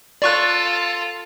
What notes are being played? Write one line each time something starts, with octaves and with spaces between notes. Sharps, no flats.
F4 A4 D5 C#6 F#6